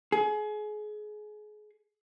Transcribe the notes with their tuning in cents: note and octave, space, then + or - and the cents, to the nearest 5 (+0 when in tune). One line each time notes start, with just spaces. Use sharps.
G#4 +30